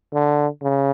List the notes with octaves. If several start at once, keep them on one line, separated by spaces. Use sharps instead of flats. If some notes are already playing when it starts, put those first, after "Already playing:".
D3
C#3